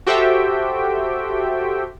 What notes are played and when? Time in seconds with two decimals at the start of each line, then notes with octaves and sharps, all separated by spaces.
0.07 F#4 G4 A4 C5 E5 G5